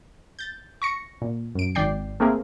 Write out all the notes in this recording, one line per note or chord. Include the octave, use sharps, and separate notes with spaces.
G6 A6
C#6 A#6 C#7
A#2
F#2 D7
G#1 D5 G5 C7
A3 A#3 C4 G#4 A#4